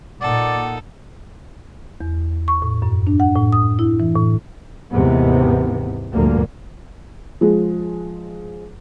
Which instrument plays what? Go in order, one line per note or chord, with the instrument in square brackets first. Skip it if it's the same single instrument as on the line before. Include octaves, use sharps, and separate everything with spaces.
[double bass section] A#2 [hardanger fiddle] D#4 A4 [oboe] D5 [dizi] F#5
[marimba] E2
C#6
A2
F#2
D4
F#5
A2
D#6
E4
E3
A2
[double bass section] D#2 G#2 C3 E3 B3
D2 G2 A#2 F3 A#3
[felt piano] F3 G#3